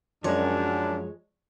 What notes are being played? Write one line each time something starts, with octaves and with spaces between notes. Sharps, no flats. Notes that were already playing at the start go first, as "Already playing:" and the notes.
F#2 F3 G#3 D4 C#5